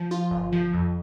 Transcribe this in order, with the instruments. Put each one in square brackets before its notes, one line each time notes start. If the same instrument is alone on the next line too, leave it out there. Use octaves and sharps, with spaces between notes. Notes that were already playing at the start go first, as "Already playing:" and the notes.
Already playing: [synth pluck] F3
F4
G1
F3
F2